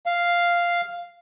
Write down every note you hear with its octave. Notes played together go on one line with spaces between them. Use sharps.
F5